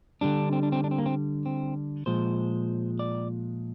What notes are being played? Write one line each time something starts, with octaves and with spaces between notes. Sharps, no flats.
D3 G3 D4
C4
D4
C4
D4
C4
A#3
C4
C4
A#2 F3 G#3 C5
D5